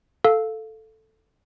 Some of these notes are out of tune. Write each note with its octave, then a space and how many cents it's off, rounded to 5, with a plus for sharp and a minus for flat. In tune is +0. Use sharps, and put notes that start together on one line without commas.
A4 +0 F5 +0